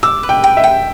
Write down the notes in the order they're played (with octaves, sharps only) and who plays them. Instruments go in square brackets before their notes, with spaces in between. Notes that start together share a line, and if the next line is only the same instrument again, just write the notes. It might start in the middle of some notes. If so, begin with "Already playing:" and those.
[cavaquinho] D6 [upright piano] E6
[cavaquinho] B4
[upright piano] G5
[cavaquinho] G5
[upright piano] E5
[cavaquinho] G5